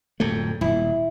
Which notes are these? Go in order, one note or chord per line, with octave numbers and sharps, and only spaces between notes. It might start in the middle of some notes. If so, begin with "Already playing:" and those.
D1 F2 A3
D#1 E4